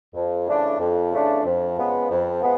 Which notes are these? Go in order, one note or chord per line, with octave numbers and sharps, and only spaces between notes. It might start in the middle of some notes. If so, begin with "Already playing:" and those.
F2
C#3 E3 A3 D4
F2
C#3 E3 A3 D4
F2
C#3 F3 G#3 B3
F2
F3 G#3 B3